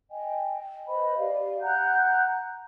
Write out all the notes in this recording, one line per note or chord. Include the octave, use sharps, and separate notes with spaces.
D#5 G5 G#5
B4 C5 D#5 B5
G4 D5 F5
F#5 A#5 F#6 G6